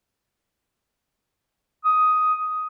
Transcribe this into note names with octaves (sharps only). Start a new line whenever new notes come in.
D#6